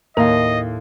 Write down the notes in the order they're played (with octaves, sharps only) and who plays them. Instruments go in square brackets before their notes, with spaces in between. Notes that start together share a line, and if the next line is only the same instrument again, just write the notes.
[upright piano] D#2 [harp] A2 F5 [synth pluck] A#4 [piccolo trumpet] D#5